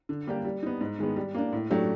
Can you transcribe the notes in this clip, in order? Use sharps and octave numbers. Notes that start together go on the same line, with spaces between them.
D3
G3 A#3 D4 G4
G3
B3 D#4
G#2
D#3 G#3 B3
G3
A#3 D4
A2
F#3 A3 D4 G4